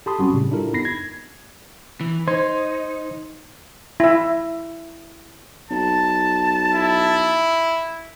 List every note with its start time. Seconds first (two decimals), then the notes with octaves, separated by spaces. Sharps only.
0.06 G4 A4 A5 B5 C6 D#6
0.19 F#3 G3 C4 C#4 F#4 G4
0.33 A2 C#3 G3
0.51 D4 E4 F4 G4 A4 A#4
0.73 B3 D#4 B5 A#6 C7
0.85 G#6
2.01 E3
2.28 D#4 C5 C6 G#6
4.00 E4 E5
5.70 B1 A5
6.75 E4